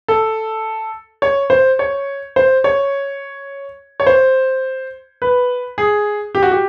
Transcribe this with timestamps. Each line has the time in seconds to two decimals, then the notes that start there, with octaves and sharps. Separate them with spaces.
0.08 A4
1.22 C#5
1.50 C5
1.79 C#5
2.36 C5
2.64 C#5
4.00 C#5
4.07 C5
5.22 B4
5.78 G#4
6.35 G4
6.43 F#4
6.51 G4